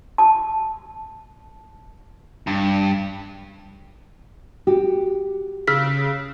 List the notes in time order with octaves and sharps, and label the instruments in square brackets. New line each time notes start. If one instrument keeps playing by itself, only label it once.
[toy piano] A5
[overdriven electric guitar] G2
[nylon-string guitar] F#4 G4
[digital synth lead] C#3 [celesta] E6 F6 B6